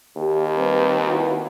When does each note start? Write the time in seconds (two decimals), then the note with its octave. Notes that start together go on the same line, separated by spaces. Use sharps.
0.17 D#2 G4
0.56 G3 C4 B4
1.07 E4 F#4 B4